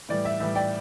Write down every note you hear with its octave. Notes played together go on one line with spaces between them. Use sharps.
A2 E3 G3 D5
E5
A2 E3 G3 E5
D5 G5